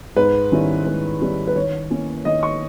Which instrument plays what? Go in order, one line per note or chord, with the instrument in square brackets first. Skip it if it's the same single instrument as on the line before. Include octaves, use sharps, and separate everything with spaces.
[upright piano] G#2 B4
D#3 G3 C#4 E4
G#2
D#3 G3 C#4 E4
B4
D#3 C#5
A#3 C#4 E4
D#3 D#5
C#6